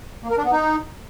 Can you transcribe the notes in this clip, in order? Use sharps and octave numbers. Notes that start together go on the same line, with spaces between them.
A#3
A#4
D4
B3
D#4